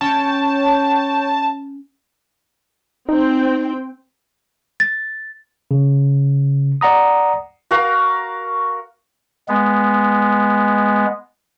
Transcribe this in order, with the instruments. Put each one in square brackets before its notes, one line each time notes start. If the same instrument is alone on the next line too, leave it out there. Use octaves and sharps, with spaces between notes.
[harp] C#4 [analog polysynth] C#5 G5 [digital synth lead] A5
[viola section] C4 G5 [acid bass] D#4
[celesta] A6
[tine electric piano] C#3
D5 F#5 A#5 D#6
[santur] F#4 A#4 F5
[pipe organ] G#3 B3